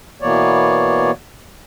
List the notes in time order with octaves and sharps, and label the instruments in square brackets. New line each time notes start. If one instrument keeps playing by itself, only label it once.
[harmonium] B2 E3 A#3 B3 C#5 D5